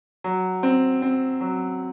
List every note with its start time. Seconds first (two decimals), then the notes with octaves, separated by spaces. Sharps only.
0.24 F#3
0.63 C4
1.02 C4
1.41 F#3